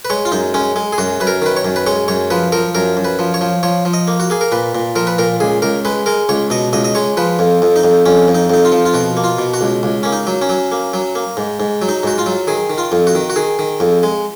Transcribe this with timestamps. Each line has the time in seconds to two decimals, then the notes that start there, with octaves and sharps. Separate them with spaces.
0.05 B4
0.10 G#3 C#5
0.25 F4
0.32 F#2 D#4
0.54 G#3 C#4
0.76 G#3
0.93 G#4
0.98 F#2 F#4
1.20 F#2 B4
1.27 A#4
1.42 D#3 B4
1.57 C#5
1.65 F#2
1.76 B4
1.87 G#3 C#5
2.08 F#2 C#5
2.30 F3 B4
2.52 F3 A#4
2.75 F#2 A#4
2.97 F#2
3.05 B4
3.19 F3
3.34 C#5
3.41 F3
3.63 F3 C#5
3.85 F3
3.94 D#5
4.08 A#3
4.20 F#4
4.30 A#3 G#4
4.41 A#4
4.52 A#2 B4
4.75 A#2
4.96 F3 A#4
5.07 B4
5.19 A#2 A#4
5.40 C#2 G#4
5.62 C#2 A#4
5.85 G#3 B4
6.06 G#3 A#4
6.29 C#2 C#5
6.50 B2 D#5
6.73 C#2 D#5
6.84 D#5
6.95 G#3 C#5
7.17 F3 B4
7.39 F2
7.62 F2
7.76 D#4
7.83 F2
8.06 F2 C#4
8.28 F2
8.35 D#4
8.50 F2 D#4
8.65 F4
8.72 F3
8.85 F4
8.94 B2 F#4
9.17 A#3
9.24 F4
9.39 B2
9.54 F#4
9.61 C#2
9.83 C#2
10.03 A#3 C#4
10.13 D#4
10.27 F#3
10.42 C#4
10.49 F#3
10.72 A#3
10.93 F#3
11.15 A#3
11.37 G#2
11.60 G#2
11.82 F#3
11.89 D#4
12.03 G#2 F#4
12.18 F4
12.26 F#3
12.47 D#3 G#4
12.70 D#3
12.78 F4
12.92 F2
13.07 F#4
13.15 D#3
13.30 F#4
13.36 D#3 G#4
13.59 D#3
13.80 F2
14.03 G#3